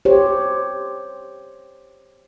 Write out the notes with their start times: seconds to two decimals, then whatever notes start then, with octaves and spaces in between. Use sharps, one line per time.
0.05 G4 C5 C#5